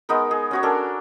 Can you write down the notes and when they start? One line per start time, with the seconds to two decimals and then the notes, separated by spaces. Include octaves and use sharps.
0.09 G#3 B3 D#4 A#4
0.31 G#4
0.51 C#4 F#4 C#5
0.63 C#4 D4 A4 A#4